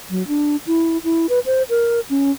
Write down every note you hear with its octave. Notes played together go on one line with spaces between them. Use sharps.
F#3
D4
E4
E4
B4
C5
A#4
C#4